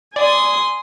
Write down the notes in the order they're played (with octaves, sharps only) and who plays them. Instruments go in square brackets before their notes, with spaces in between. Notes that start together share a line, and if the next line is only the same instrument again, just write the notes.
[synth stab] D5 [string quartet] G#5 C6 D#6